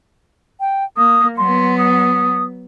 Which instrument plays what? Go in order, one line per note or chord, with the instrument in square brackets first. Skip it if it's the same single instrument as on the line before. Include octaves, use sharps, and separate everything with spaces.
[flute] G5
[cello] A#3 [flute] D#6
[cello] F#3 B3 [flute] C6
[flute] D#6